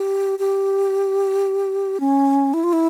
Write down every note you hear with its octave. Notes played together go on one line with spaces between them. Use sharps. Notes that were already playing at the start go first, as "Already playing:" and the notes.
Already playing: G4
G4
C#4
E4
F4
E4